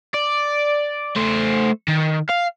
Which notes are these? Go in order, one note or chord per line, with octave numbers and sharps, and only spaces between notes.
D5
A3 C5
D#3
F5